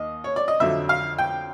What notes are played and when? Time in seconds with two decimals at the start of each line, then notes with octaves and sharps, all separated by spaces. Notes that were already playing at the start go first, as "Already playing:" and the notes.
Already playing: D#2 D#5
0.24 C#5
0.36 D5
0.48 D#5
0.60 F2 D3 F#3 E5
0.89 F5
1.18 G5